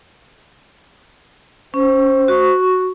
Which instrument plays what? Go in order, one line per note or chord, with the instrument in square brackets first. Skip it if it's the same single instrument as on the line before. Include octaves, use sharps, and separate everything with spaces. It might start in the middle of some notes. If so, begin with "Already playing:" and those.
[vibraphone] C#4 [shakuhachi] C5
[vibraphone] F#4 C#6